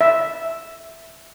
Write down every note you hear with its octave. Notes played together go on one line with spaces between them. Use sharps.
E5